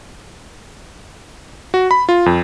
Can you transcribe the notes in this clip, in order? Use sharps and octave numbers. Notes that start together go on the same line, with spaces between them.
F#4
B5
F4
F2